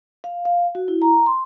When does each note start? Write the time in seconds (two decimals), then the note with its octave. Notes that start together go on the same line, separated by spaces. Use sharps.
0.24 F5
0.45 F5
0.75 F#4
0.88 E4
1.02 A#5
1.26 C6